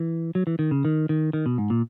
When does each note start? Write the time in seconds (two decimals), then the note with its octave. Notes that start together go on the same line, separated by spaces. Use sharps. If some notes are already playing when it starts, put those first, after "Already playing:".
Already playing: E3
0.35 F#3
0.47 E3
0.59 D#3
0.71 C#3
0.85 D#3
1.09 D#3
1.33 D#3
1.46 B2
1.58 G#2
1.70 A#2